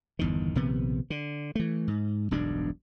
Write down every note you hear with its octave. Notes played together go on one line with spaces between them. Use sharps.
G1 E2 D#3
A#1 C3 D#3 B3
D3
E3 A3
G#2
E1 B1 G2 D4